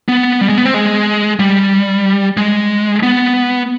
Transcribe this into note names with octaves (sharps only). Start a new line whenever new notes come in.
B3
G3
G#3
B3
C4
G#3
G3
G#3
B3